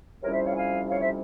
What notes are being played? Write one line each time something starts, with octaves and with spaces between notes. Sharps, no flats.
F2 C3 G3 C#4 E4 A#4 C#5
C5 E5
C#5 F5
F5 G#5
C#5 F5
C5 E5